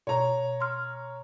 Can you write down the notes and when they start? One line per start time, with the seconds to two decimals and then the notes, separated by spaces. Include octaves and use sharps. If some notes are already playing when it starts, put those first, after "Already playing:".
0.07 B2 C#5 A#5
0.61 C6 F6